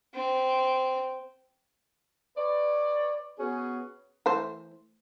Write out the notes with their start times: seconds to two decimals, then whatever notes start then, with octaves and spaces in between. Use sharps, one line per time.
0.14 C4
2.38 B4 C#5 D5
3.39 B3 C#4 F#4 G#4
4.26 E3 A3 C5